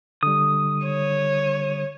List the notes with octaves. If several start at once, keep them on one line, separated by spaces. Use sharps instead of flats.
D3 G3 D#6
C#5